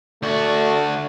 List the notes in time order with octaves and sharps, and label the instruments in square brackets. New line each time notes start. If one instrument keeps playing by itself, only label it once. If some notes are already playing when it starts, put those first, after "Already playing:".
[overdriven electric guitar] D2 F#4 [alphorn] A3 [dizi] D5